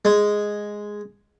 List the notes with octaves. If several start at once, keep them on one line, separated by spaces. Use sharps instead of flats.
G#3